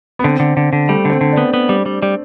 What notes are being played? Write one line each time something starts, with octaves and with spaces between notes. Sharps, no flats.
B3
D3 C4
D3
D3
D3
G3 A3
D3 C4
D3
D4
B3
B3
G3
G3
G3